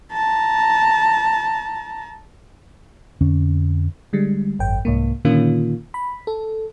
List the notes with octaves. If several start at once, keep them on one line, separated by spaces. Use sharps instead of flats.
A5 A#5
F2 D3 C#4
D3 G3 G#3
G#1 F#2 G5
C2 G#2 A#3
A#2 D3 D#3 A#3 C#4 F4
B5
A4